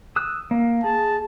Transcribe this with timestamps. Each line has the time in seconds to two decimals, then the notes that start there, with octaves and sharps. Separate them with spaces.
0.16 D#6 E6 F#6
0.51 A#3
0.84 G#4 A5